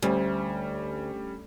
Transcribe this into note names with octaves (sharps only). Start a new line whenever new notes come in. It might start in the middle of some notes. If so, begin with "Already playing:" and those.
D2 G3 C#4